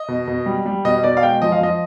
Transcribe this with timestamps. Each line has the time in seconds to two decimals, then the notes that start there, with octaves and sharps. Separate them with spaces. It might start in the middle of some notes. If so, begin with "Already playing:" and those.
Already playing: D#5
0.08 B2
0.28 B2
0.46 G3
0.66 G3
0.85 B2 D#5
1.04 B2 D5
1.17 F5
1.23 G#3 G5
1.42 F3 D#5
1.52 F5
1.61 F3 D#5